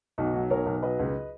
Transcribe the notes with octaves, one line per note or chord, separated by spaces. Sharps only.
B1 D#4 F#4
F#3
B1 A#4 C#5
B1
F#3 B4 D#5
C#2